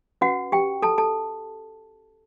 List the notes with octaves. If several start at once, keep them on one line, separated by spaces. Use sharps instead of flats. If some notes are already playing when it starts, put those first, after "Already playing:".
C#4 F#4 B4 F#5
G4 G5
A4 A5
A4 A5